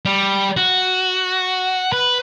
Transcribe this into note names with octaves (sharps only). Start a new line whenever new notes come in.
G3
F#4
B4